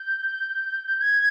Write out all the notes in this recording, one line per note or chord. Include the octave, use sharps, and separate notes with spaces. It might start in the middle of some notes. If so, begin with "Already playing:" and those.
Already playing: G6
G#6